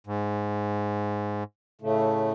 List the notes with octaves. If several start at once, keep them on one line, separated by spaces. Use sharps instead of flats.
G#2
A2 C#3 A3